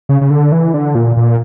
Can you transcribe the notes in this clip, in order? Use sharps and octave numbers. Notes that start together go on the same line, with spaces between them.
C#3
C#3
D3
E3
D3
A#2
A#2